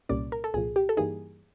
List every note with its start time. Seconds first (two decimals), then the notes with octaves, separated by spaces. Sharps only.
0.09 C2 A#2 G3 A#3 C#4 D5
0.32 A#4
0.44 A4
0.54 C2 A#2 F3 G#4
0.76 G4
0.89 A4
0.97 G2 E3 G3 A#3 D#4 G#4